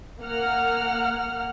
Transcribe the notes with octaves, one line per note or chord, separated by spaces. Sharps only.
A#3 F#5 F6